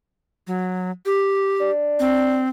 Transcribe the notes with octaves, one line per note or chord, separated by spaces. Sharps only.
F#3
G4
D4
C4